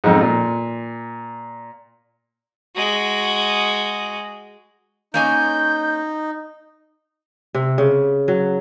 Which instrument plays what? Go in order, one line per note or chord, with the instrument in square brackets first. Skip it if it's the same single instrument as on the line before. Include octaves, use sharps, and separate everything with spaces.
[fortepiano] F2 G#2
A#2
[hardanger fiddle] G#3 F#4
[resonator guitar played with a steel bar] A#3 C#4 G#5 [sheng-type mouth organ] D#4 [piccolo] G6
[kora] C3
C#3
F#3